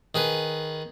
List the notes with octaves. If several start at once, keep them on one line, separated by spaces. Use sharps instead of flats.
D#3 G#4 B4